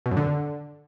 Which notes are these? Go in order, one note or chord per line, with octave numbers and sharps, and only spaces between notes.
B2
F#2
D3